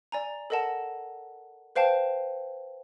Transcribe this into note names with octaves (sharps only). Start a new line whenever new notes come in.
D5 G#5 A#5
A4 A#4 D#5 F#5 A5
B4 C5 F5 G5 A5